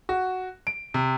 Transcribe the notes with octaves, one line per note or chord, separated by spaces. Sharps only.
F#4
D7
C3